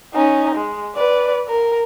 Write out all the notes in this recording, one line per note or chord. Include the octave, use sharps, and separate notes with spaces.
C#4 D#4
G#3
B4 D5
A#4